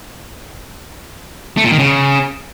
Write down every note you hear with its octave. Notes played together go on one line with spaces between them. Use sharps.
A3
A#2
D#3
C#3